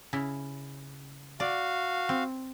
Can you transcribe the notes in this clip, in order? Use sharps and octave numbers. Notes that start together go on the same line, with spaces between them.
C#3 E4
F#4 D5 F5
C4